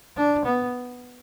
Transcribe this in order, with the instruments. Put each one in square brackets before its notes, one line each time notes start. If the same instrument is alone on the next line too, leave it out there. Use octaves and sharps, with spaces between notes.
[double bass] D4
B3